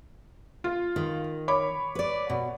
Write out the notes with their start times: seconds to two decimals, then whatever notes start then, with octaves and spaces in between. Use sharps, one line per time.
0.64 F4
0.96 D#3
1.48 C#5 B5 D6
1.95 B4 D5
2.30 B2